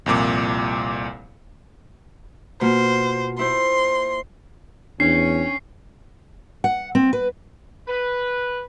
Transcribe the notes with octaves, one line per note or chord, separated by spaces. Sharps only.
C2 F2 A#2 D6
B2 A#3 F4 C5
E4 C5 C6
E2 C#4 D4 C#5 C7
F#5
C4
B4
B4